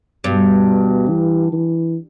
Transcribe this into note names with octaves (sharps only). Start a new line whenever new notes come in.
G2 B2
E3
E3